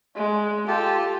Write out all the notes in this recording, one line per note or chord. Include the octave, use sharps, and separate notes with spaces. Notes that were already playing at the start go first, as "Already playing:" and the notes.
G#3
F4 G4 A4